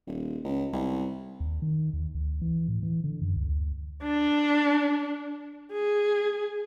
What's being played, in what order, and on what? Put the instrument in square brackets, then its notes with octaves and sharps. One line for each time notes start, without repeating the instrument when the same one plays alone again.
[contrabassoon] D#1
C#2
C2
[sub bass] D#2
D#3
D#2
D2
E3
A2
E3
D3
F#2
C#2
D2
[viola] D4
G#4